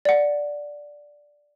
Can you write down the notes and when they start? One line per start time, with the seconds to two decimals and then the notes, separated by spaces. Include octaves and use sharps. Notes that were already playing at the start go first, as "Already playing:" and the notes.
0.05 D5 F#5